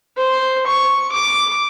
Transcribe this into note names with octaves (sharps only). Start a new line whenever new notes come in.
C5
C#6
D6